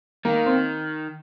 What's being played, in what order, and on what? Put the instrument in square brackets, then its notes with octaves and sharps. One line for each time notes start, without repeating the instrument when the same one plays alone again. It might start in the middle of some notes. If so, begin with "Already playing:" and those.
[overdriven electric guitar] D#3 [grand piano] A#3
[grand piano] C4